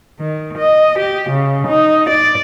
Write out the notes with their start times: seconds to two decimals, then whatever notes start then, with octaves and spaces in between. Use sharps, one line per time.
0.20 D#3
0.58 D#5
0.99 G4
1.30 C#3
1.68 D#4
2.10 D5